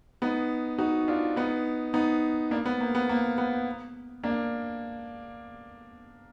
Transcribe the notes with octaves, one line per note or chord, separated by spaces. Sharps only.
B3 D#4
D#4 F#4
D4 F4
B3 D#4
B3 D#4
A#3 D4
B3
A#3
B3
A#3
B3
A#3 D4